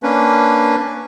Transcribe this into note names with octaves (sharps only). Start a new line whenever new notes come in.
A#3 C#4 D4 B4